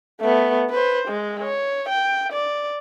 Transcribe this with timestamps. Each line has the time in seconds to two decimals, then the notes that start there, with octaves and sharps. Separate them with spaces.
0.21 A3 B3
0.70 B4 C5
1.08 G#3
1.44 C#5
1.89 G5
2.33 D5